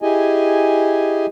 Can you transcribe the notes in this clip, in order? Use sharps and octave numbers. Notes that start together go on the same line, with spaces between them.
E4 G4 G#4 D#5 G#5